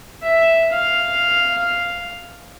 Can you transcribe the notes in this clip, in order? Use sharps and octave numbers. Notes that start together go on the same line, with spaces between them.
E5
F5